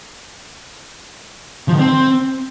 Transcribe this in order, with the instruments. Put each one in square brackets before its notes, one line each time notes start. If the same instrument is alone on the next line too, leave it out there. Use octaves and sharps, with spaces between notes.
[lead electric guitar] F3
D#3
C4